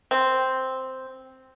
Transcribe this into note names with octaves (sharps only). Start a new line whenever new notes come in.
C4